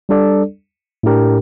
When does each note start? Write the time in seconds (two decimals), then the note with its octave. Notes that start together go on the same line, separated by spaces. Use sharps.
0.09 G3 D4 A4 D5
1.03 A2 A3 D4 G4 A#4